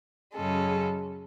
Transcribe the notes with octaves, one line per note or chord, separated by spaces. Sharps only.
F#2 C#3 G#3 A4